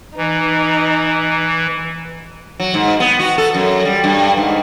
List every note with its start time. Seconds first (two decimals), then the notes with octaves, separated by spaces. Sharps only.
0.17 E3 D#4
2.60 F#3
2.74 G#2
3.00 B3
3.19 F#4
3.38 A4
3.55 F#2
3.85 G3
4.04 G2
4.37 G#2